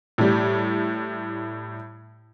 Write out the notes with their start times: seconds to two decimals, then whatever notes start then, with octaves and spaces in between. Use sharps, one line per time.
0.18 A2 G3